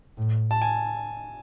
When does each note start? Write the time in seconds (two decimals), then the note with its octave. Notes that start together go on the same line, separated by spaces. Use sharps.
0.18 A2
0.51 A5
0.62 G#5